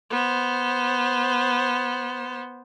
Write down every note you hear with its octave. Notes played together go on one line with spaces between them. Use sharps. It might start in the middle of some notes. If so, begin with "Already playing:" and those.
B3 C5